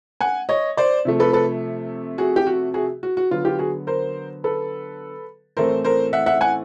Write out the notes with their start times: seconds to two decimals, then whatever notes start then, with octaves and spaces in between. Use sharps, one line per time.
0.21 F#5 G#5
0.49 C#5 D#5
0.77 C5 D5
1.05 C3 F3 A3
1.20 A4 B4
1.33 A4 B4
2.18 F#4 G#4
2.36 G4
2.47 F#4
2.74 F#4 G#4
3.03 F#4
3.17 F#4
3.31 D3 F#3 B3 F4
3.45 F4 G4
3.59 F#4 G#4
3.87 A#4 C5
4.44 A4 B4
5.57 A2 E3 A3 C4 A#4 C5
5.84 A#4 C5
6.13 E5 F#5
6.26 E5 F#5
6.41 F#5 G#5